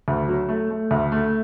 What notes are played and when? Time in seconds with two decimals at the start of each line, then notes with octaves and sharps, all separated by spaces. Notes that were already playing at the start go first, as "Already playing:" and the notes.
0.08 D2
0.28 F#3
0.49 A3
0.70 A3
0.91 D2
1.12 A3